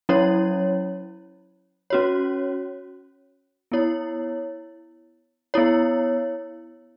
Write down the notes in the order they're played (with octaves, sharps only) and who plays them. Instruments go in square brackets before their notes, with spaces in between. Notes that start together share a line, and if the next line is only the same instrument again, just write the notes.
[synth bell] F#3 C#4 E4 C#5
C#4 F#4 C#5
B3 E4 C#5
B3 E4 C#5